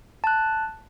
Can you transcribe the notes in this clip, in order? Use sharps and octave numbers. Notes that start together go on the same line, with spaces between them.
A5 F#6